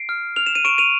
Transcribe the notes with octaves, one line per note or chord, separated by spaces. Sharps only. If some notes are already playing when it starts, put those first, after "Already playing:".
Already playing: C7 D7
F6
F6 F7
E7
D#7
C#6 D7 E7
D#7 F7